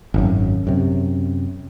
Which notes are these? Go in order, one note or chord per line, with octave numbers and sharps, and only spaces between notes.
G#1 F#2
F#2 C3